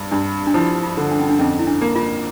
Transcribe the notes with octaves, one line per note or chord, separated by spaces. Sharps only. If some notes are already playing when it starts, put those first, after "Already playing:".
Already playing: G2
G2 D4
D4
F3 E4
F4
D3
D4
C#4
D4
F2 C#4
E4
D4
A#3
F4